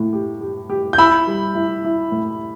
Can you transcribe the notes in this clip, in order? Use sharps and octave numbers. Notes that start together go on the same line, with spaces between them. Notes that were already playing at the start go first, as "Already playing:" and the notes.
Already playing: A2
G4
G4
G4
G6
E4 B5 E6
G3
E4
E4
A2